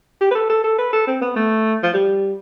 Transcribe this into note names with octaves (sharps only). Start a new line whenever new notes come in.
G4
B4
A4
A4
A4
B4
A4
C4
B3
A3
F3
G3